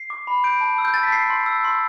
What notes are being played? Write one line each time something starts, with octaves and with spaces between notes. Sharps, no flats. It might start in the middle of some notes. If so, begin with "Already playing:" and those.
Already playing: C7
D6
B5
G6 D7
A5
E6
G6
A5 A6
B6
G6 C7
C6
E6
C6